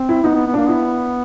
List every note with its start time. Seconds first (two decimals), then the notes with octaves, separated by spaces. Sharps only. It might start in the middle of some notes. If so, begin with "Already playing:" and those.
Already playing: C4
0.09 E4
0.24 B3 D#4
0.35 B3
0.46 B3
0.54 A#3 D4
0.68 B3 E4